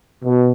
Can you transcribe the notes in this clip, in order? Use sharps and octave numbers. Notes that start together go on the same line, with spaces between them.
B2